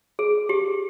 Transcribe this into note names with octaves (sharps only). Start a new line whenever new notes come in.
G#4
G4